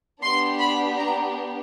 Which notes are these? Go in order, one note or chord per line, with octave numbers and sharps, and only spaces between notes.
B3 D4 G4 C6
B5
A#5